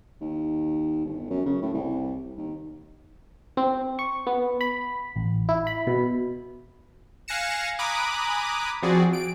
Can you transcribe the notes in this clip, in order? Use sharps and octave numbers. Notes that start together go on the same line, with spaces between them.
D#2
G1
F#2
C#3
A2
C2
D#2
C4
C#6
B3
B5
A1
E4
B5
B2
F5 G#5 F#6 A#6 C#7 E7
G#5 A#5 B5 D6 D#6 F#6
F3 C4 F#4 G#4 D5
D7